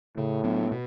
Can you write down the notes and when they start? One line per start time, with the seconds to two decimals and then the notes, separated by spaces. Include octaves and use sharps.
0.17 A2 C#3
0.44 F#3 B3 D4
0.72 B2